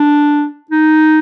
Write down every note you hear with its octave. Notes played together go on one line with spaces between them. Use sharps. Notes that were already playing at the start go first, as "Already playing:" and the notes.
Already playing: D4
D#4